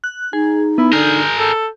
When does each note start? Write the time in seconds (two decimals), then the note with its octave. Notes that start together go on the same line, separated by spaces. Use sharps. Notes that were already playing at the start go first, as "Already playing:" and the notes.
0.04 F#6
0.33 D#4 G#4
0.78 B3 E4
0.93 D3 G#4 A#4 G6
1.39 A4